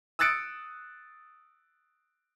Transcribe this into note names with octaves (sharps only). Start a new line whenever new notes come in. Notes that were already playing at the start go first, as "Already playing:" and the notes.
D#6 E6 F#6 A6 C#7 D7